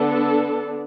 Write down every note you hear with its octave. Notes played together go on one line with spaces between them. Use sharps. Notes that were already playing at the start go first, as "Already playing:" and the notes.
Already playing: D3 B3 D4 A4